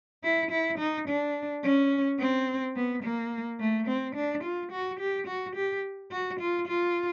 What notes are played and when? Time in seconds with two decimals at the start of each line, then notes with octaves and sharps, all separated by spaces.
0.24 E4
0.51 E4
0.78 D#4
1.08 D4
1.63 C#4
2.19 C4
2.76 B3
3.03 A#3
3.60 A3
3.87 C4
4.15 D4
4.43 F4
4.72 F#4
5.00 G4
5.27 F#4
5.56 G4
6.11 F#4
6.40 F4
6.67 F4